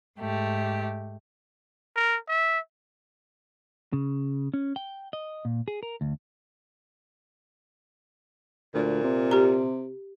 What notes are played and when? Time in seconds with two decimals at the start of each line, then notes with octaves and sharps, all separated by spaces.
0.19 G#2 A3 G4
1.96 A#4
2.29 E5
3.93 C#3
4.54 C#4
4.76 G5
5.13 D#5
5.45 A#2
5.68 G#4
5.83 A#4
6.01 D2
8.74 D2 A#2
9.03 C3
9.31 G4 A#5